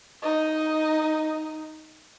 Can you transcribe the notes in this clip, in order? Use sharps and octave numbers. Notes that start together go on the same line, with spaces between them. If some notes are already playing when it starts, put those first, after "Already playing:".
D#4 D#5